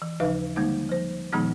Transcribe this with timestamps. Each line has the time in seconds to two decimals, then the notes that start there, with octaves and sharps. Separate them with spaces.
0.02 E3
0.20 D#2 C#3 F3 D#4 B4 F5
0.56 D3 G3 G#3 A#3 D#4
0.89 F3 C5
1.32 A#2 D#3 F3 G#3 B3 D#4